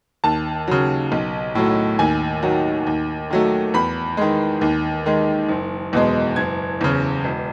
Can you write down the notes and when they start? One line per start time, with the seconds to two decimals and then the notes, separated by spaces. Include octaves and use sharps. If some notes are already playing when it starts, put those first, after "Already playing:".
0.24 D#2 A5
0.68 C#3 F#3
1.12 B1
1.55 A2 F#3 A3
1.99 D#2 G#5
2.43 D#3 F#3
2.86 D#2
3.30 D#3 F#3 A3
3.74 E2 B5
4.17 D#3 G#3
4.61 D#2
5.06 D#3 G#3
5.49 F#1
5.93 E2 B2 G#3
6.36 F#1 G#6
6.81 E2 C#3
7.24 E1